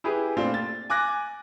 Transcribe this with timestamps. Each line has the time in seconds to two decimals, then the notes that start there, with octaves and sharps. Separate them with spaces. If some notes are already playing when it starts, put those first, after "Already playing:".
0.04 E4 G4 G#4 B4
0.36 A#2 A3 C4 D4 F4
0.54 A6
0.90 G#5 D6 F#6 A#6